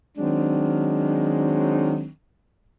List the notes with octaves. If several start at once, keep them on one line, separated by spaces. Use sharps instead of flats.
D#3 F#3 G#3 C4 D4